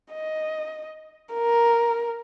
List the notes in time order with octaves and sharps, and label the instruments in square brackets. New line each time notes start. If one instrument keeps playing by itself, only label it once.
[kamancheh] D#5
A#4